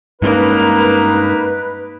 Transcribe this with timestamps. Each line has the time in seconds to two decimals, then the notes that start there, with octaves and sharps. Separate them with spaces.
0.22 G2 G#3 A#3 C#4 D#4 B4